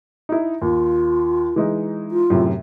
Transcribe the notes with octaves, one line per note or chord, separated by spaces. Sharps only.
D#4 E4
D#2 F4
E3 G#3 D#4
F4
F#2 A2 C3